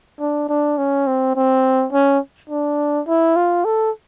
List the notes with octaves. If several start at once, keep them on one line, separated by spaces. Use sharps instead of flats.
D4
D4
C#4
C4
C4
C#4
D4
E4
F4
A4